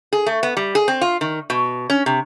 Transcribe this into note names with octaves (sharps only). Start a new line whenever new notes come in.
G#4
A3
B3
G3
G#4
C4
F4
D#3
B2
C#4
C3